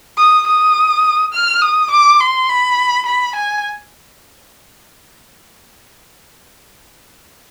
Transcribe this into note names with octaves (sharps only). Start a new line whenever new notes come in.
D#6
D#6
F6
D#6
D6
C6
B5
B5
G#5